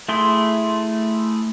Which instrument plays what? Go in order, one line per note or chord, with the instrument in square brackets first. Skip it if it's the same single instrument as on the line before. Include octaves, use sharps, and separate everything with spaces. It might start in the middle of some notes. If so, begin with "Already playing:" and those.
[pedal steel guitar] A3 E4 G#4 C6